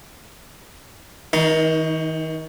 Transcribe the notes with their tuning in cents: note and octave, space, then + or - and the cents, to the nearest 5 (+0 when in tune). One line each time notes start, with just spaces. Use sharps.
D#3 +40 D#4 +0